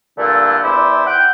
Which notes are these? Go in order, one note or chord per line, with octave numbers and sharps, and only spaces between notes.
G2 A#2 D3 A3 D4 E4
E2 E4 C5 D5 E5
F#5 G5